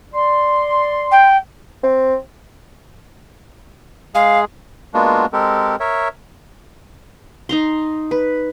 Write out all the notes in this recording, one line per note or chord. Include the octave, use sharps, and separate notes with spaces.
D5 C6
G5
C4
G#3 G#4 F5
G#3 A#3 B3 D4 F4 F#4
G#3 C4 G4 A4 A#4
A#4 C#5 E5
D#4 A#5 C6
B4